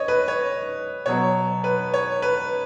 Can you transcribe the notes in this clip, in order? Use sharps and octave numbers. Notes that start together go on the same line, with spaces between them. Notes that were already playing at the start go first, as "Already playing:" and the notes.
Already playing: C#5 D#5
B4
C#5
B2 F#3 C#5
B4
C#5
B4